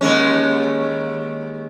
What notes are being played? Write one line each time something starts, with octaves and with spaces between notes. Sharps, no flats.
D#2 G#3 C#4